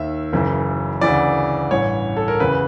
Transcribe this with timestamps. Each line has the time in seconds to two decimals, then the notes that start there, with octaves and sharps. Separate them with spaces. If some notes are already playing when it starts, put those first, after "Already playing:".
Already playing: D#2 D#3 E5
0.33 F#1 F#2 C#3 E3
1.01 D2 C#3 E3 D5
1.71 A1 G2 E3 C#5
2.17 A4
2.28 A#4
2.40 F#1 E2 C#3 E3 B4